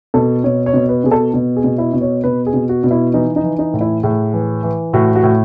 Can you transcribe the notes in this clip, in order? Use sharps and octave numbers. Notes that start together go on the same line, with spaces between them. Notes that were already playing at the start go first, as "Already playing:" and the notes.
B2 A4
B2 C#5
C#5
B2
B4
B2 G#4
A4
B2
G#4
B2
E4
B2
C#5
B2 B4
G#4
B2
F#4
B2
E4
E3 D#4
D#4
E3
D#4
A2
E4
A2 G#4
E3
E3
A2 F#4
F#4
A2